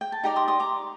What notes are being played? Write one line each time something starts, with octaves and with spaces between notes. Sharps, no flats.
G5
A5
D#4 G4 D5 G5 A#5
C6 D#6
C6 D#6
A#5 D6